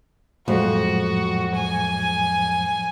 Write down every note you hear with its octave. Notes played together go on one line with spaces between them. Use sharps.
F2 A2 F#3 G#3 F#4
G#5